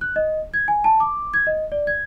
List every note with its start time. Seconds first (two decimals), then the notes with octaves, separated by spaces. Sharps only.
0.01 F#6
0.16 D#5
0.54 G#6
0.68 G#5
0.84 A5
1.00 D6
1.34 G#6
1.47 D#5
1.72 D5
1.87 G#6